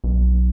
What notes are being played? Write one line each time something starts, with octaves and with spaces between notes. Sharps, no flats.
B1